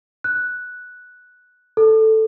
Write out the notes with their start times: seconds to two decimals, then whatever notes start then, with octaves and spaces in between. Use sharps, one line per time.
0.24 F#6
1.77 A4